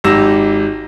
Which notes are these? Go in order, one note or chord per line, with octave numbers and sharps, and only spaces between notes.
G#1 D#4 G4 E6 A#6 E7